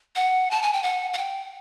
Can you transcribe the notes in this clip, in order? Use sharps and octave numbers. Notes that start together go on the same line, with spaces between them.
F#5
A5
G#5
G5
F#5
F#5
G5